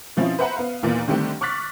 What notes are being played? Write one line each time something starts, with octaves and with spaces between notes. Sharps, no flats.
B2 F3 C4 C#4 E4 F4
B4 C5 E5 F#5 A#5 B5
B3 F5
D#2 A#2 E3 A#3 B3
D3 D#3 G3 A3 C4 G4
C#6 D6 F6 F#6 A6 B6